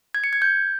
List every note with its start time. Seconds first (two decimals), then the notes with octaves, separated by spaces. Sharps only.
0.15 G#6
0.24 C#7
0.33 G#6
0.42 G6